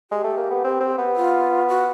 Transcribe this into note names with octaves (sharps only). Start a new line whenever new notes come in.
G#3 G4
A3
A#3
B3
C4
C4
B3
F4
F#4